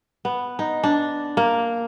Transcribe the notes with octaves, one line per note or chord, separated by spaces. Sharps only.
B3
D#4
D4
A#3